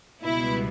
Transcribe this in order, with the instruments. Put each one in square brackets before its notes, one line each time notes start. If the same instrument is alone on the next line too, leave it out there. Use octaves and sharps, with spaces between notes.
[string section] C#2 B2 G3 B3 E4